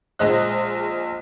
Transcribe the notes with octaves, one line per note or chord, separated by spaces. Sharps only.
A#1 G#3 C5 D#5 F#6